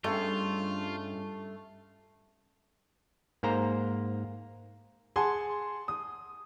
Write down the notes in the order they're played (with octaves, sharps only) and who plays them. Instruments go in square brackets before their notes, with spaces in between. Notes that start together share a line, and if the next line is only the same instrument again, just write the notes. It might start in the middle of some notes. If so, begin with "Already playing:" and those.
[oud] G2 [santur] A3 [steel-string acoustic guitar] C#4 G#4 D#5 [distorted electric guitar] F4
[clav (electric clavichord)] G#2 A#3 C5 A#5
[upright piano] G#4 F#5 G#5 A5 C6
D#6